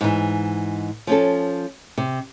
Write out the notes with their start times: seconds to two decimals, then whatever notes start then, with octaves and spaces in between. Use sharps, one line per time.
0.01 G#2 E3
1.07 F3 C#4 A4
1.98 C3